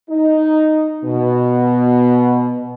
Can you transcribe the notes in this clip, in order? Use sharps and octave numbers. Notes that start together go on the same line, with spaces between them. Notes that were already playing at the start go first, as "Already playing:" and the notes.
D#4
B2